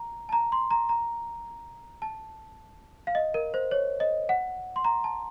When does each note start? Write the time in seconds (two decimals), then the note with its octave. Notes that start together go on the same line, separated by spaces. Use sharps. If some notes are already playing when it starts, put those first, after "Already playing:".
Already playing: A#5
0.29 A5
0.33 A#5
0.52 C6
0.71 A#5
0.89 A#5
2.02 A5
3.07 F5
3.15 D#5
3.34 A#4
3.54 C5
3.71 C#5
4.00 D#5
4.29 F#5
4.76 C6
4.84 A#5
5.04 A5